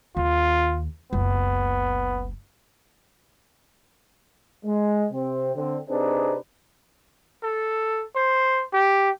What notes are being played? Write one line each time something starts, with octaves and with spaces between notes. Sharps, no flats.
D#2 F4
F#1 C#2 B3
G#3
C3 C4
D3 C4
C3 C4 D4 D#4 G#4 B4
A4
C5
G4